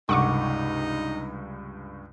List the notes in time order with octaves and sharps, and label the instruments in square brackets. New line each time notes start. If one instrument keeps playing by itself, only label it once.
[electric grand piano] C#2 G2 [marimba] C3 [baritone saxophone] D#4 [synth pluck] F#5 C#6 D6